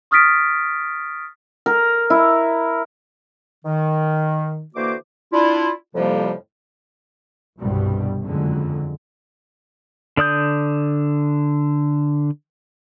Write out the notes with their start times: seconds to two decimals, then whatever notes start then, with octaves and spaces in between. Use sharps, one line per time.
0.11 C#6 D#6 F6 A6 B6 D7
1.66 A#4
2.10 E4
3.65 D#3
4.75 D3 E3 A#3 F#4 C5 D6
5.32 D4 E4 F4
5.94 F2 A2 C3 F3 G3 A#3
7.60 G1 C2 G2 B2 G3 C4
8.23 F#1 F2 D3 F#3 G#3
10.17 D3 D5 D#6 G6